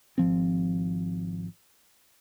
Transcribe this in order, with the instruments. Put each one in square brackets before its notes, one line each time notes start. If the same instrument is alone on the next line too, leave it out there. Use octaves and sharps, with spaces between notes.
[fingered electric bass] G#1 F3 C4